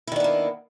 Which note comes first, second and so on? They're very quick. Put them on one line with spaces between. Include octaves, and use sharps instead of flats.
E4 D#3 D4 B3 A#3